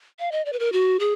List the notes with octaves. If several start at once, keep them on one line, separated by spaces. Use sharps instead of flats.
F5
D#5
D5
B4
A#4
F#4
G#4